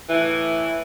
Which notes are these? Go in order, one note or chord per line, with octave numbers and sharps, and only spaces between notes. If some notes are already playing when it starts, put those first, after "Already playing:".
A2 E3